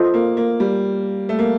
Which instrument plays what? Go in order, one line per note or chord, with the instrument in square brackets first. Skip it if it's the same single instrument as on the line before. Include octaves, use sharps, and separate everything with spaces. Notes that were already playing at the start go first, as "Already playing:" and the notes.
Already playing: [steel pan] F4 A4 C5 D#5
[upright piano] A#3
A#3
G3
A3
A#3